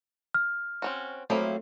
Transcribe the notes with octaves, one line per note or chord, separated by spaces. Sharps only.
F6
C4 C#4 F#4
F3 F#3 A3 A#3 C4 E4